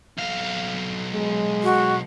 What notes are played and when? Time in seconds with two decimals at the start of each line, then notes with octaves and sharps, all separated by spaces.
0.18 B1 F5
1.13 G#3
1.63 F#4